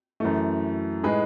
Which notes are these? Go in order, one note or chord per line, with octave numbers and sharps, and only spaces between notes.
F#2 E3 A3
A2 G#3 D#4 G#4 B4